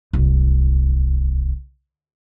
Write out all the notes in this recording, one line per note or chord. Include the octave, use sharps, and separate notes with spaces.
D1 C2